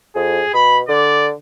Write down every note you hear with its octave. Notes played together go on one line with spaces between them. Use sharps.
F2 G#4
B2 B5
D3 D5